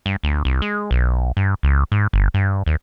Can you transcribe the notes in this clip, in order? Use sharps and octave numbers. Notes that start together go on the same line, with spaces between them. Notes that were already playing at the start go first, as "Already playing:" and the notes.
G2
D2
C2
G#3
B1
G2
C#2
G#2
G1
G2
D#2